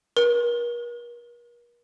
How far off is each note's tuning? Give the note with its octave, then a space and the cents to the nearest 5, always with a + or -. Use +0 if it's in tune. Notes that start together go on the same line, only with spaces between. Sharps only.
A#4 +40